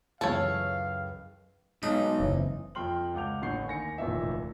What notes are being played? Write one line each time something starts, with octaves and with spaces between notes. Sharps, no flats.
C#2 F#2 E3 E4 A4 C#5 F5
B1 G#3 B3 D#4
F#1 C#2 E3 C4
F2 G5 C6 F6 F#7
C#2 F#5 D6 G6 F7
A1 D3 F#5 C#6 G6 C7
D#2 G#5 A#6 C#7
F1 A#1 D#2 A2 E3 E5